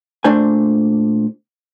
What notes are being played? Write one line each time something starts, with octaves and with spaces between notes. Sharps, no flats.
A#2 A3 D4 C5 G#5